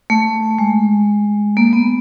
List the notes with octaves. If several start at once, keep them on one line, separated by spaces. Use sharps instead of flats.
A3
G#3
A#3
B3